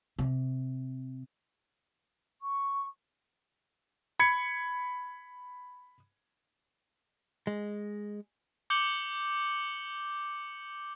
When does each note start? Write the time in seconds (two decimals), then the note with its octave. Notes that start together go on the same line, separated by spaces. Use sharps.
0.19 C3
2.42 C#6
4.20 B5 G#6 C#7
7.47 G#3
8.70 D6 G6 C#7 F#7 G7